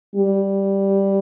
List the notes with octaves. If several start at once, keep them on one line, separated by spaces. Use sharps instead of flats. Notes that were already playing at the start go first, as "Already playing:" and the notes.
G3